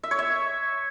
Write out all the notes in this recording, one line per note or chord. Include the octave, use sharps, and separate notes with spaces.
E5
C#5
E5